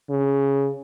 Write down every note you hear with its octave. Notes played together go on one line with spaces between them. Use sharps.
C#3